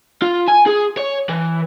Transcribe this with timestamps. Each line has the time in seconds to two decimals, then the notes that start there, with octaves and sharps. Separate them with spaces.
0.22 F4
0.48 G#5
0.67 G#4
0.97 C#5
1.29 E3